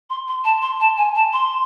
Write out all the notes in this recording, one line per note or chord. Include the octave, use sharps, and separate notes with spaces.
C6
C6
A5
C6
A5
G#5
A5
C6